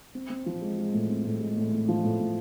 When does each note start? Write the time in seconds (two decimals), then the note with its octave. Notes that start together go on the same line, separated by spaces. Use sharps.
0.15 C4
0.30 C4
0.46 F3
0.61 G#3
0.78 G#3
0.93 A2
1.10 C4
1.25 A2
1.40 G#3
1.56 A2
1.73 A2
1.89 F3
2.04 A2
2.20 A2